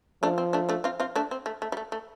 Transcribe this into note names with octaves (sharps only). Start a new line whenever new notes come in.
F3 A3 D4
C4
A3 D4
A3 D4
C4 F4
C4 F4
A3 D4
C4
A3
A3
G3
A3
A3